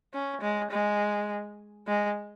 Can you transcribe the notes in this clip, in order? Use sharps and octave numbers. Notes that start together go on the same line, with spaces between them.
C#4
G#3
G#3
G#3